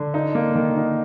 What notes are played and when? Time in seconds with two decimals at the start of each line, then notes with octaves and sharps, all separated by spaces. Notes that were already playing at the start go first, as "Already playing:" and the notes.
Already playing: D3
0.14 D#4
0.35 A#3
0.55 D#3
0.76 D#4